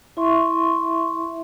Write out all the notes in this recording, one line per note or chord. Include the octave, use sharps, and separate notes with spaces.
E4 E5 C6 C#6